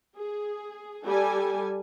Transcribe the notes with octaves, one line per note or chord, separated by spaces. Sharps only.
G#4
G3 A4 G#5